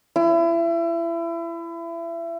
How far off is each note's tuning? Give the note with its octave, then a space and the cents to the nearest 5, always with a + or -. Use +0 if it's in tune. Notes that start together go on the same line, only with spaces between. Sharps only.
E4 +30